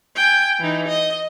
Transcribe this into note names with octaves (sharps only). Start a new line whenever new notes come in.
G5 G#5
E3 D#4
D#5